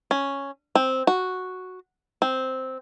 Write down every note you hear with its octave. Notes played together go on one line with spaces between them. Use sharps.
C#4
C4
F#4
C4